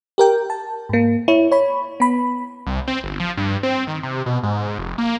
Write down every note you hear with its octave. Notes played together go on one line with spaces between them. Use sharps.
G4 A#4 G5
A5
G#2 A#3
E4 C#5
C#5 B5
B3 B5
C2
C4
G1
F3
G2
C4
D#3
C3
B2
G#2
F1
A#3